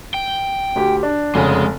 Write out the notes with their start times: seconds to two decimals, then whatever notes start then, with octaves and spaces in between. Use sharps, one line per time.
0.14 G5
0.76 D2 G4
1.03 D4
1.35 F1 C#3 G#3